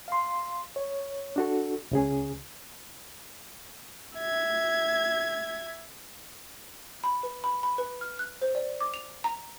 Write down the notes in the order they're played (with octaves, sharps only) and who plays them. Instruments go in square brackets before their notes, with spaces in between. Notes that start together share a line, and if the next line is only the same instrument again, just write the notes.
[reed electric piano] F5 C6
C#5
D4 F#4 A4
C#2 C#3 G#4
[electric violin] E5 G#6
[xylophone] B5
B4
B5
B5
B4
F6
F#6
C5
D5
D6
F7
A#5